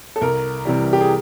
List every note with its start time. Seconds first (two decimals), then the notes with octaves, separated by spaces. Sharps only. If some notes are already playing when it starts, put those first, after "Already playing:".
0.16 A4
0.21 C2 A#4
0.65 C3 E3 G3
0.93 G4
1.01 G#4